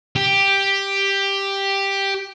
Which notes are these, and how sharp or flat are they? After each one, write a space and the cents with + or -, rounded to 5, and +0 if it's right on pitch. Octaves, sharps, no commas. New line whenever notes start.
G4 +5